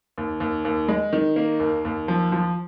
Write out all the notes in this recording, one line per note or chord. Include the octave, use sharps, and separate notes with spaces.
D#2
D#2
D#2
G#3
D#3
A#3
D#2
D#2
F3
F3